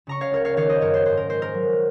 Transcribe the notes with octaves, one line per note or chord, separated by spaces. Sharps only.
C#3 A#5 C#6
C#5 F5
C#2 A#4 C#5
C#5 F5
D#3 C#5 F5
C5 D#5
F#2 A#4 C#5
C5
G#2 C5
A#4
G#3 C5
A#4
F#3